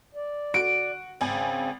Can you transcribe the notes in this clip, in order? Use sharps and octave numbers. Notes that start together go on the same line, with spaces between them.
D5
F#4 D7
G#1 C#3 C4 G#5